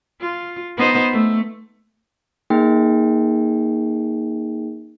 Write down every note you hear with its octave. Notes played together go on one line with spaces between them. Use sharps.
F4
B3 D#4 C5
A3
A#3 D#4 G#4 G5